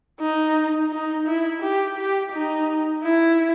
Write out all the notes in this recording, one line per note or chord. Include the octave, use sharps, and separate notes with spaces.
D#4
D#4
E4
G4
G4
D#4
E4